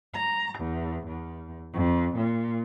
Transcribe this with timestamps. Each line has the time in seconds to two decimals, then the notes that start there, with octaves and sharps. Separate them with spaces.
0.14 A#5
0.60 E2
1.07 E2
1.74 F2
2.17 A#2